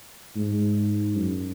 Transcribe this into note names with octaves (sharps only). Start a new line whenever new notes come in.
G#2
F#2